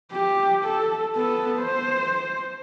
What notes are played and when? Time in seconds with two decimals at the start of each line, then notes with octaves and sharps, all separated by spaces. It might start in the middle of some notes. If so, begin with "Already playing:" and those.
0.12 G4
0.65 A4
1.16 B3 A4
1.59 C5